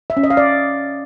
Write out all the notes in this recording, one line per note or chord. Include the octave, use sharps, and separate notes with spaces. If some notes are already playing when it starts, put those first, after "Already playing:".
E5
C#4
D#5
F5
D5